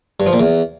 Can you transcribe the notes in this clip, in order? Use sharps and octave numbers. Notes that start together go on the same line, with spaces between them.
G2
F3
A#2
E2